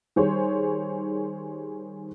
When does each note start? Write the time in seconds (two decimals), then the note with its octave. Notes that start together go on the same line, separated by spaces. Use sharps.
0.16 D#3 G3 G#4 C5 C#5